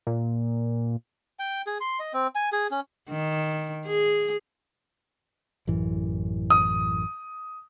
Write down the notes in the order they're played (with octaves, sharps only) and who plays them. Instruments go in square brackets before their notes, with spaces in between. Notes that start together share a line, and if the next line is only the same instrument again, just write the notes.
[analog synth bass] A#2
[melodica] G5
G#4
C6
D#5
C4
G#5
G#4
C#4
[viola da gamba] D#3
G#4
[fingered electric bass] A1 F#2 E3
[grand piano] D#6